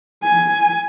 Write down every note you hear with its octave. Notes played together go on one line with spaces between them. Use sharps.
G#5